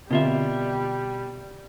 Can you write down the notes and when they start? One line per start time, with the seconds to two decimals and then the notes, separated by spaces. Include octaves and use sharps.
0.11 B2 D3 G3 C4 F4 E5